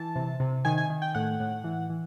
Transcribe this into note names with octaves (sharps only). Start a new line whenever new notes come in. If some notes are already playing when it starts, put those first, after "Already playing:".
Already playing: E3 A5
C3
C3
D#3 G#5
G#5
D#3
G5
A2 F#5
A2
E3
E3